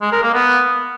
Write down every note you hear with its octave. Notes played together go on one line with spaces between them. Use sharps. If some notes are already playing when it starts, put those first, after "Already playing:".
G#3
A#4
A#3
B3